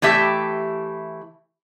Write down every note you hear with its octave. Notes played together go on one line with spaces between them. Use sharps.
E3 A3 G4 E5